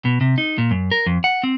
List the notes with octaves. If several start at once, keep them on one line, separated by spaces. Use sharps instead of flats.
B2
C3
D#4
A#2
F#2
A#4
F2
F#5
C4